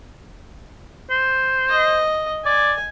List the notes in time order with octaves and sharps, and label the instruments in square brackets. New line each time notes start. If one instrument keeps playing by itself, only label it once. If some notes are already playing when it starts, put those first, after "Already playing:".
[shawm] C5
[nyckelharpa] D#5
[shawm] D5 [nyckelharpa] G#5